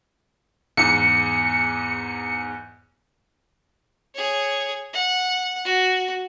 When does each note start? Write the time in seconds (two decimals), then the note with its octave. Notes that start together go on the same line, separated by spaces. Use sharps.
0.77 E2 G#2 C#7
4.15 G#4 C#5
4.93 F#5
5.65 F#4